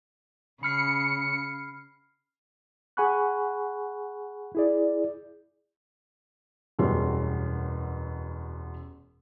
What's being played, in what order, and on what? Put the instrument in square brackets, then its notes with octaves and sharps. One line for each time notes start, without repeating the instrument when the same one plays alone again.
[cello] C#3 [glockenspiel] B5 F6 C7 [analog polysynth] C#7
[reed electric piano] G#4 F#5 G#5 B5 C#6 F#6
E4 G#4 D5
[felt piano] E1 F#2 B2 G3 C6